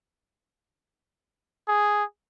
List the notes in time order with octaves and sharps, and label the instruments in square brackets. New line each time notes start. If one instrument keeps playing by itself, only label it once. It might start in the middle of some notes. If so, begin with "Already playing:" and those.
[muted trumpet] G#4